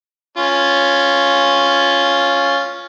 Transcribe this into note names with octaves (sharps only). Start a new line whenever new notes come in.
C#4 F4